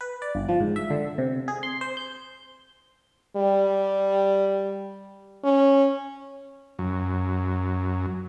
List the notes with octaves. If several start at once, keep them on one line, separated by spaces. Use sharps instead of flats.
B4
D5
G1
F3
G#2
E5
D3
C3
G#4
C6
C5
G6
G3
C#4
F#2